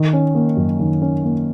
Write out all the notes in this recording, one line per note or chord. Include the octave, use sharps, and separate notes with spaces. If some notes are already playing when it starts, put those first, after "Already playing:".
Already playing: D#3
C#4
A#3
F#2
D#3
C#4
A#3